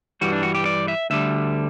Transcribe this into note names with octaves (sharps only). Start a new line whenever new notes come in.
G2 E3 G3 F#4
D4
F#4
G4
D5
E5
D2 D3 G3 E5